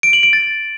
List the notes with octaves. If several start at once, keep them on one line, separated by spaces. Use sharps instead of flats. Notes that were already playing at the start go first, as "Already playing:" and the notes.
D7
F#7
D7
A6